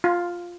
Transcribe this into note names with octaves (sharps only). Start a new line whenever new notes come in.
F4